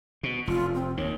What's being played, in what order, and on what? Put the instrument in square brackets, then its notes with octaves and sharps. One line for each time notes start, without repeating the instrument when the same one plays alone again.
[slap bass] B2
[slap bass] F1 [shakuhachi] F4
[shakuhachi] C4
[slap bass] D#2 D#3 [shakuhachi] C#5